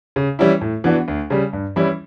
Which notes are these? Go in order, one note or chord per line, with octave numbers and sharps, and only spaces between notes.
C#3
E3 G3 C#4 E4
A2
E3 B3 D4 F#4
D2
C#3 G3
G2
E3 G3 C#4 E4